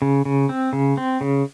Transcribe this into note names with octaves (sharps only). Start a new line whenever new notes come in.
C#3
C#3
C4
C#3
C4
C#3